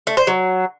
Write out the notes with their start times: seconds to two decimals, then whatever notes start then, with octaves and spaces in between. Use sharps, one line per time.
0.07 A3
0.17 C5
0.27 F#3